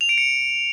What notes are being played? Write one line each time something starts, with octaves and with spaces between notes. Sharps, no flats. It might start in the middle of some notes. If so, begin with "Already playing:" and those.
F7
D7
C#7